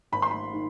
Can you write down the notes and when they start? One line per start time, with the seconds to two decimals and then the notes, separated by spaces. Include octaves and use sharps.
0.12 G#1 B5
0.22 C6
0.31 B5
0.53 D#3